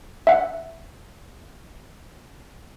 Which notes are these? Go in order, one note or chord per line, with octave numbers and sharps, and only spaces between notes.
E5 F#5